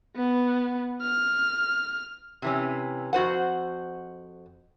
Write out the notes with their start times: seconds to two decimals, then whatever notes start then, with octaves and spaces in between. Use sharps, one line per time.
0.16 B3
1.02 F6
2.42 C3 E3 C#4
3.13 F2 F#4 C5 F#5